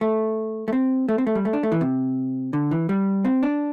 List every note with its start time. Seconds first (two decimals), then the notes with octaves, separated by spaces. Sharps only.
0.01 A3
0.68 A3
0.73 C4
1.09 A3
1.18 C4
1.27 A3
1.35 G3
1.45 A3
1.53 D4
1.63 A3
1.72 E3
1.81 C3
2.53 D3
2.71 E3
2.89 G3
3.25 C4
3.43 D4